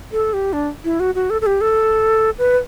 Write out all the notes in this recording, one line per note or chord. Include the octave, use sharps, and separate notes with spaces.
A4
G4
D4
E4
F#4
F#4
A4
A4
G4
A4
B4